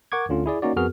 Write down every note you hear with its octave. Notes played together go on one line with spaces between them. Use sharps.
A#4 F#5 C#6 D6 G#6
D2 D3 C#4 F4
E4 G#4 D5
A#3 C#4 D#4 F#4 D5
F2 B3 F#4 G#4 A#4 F6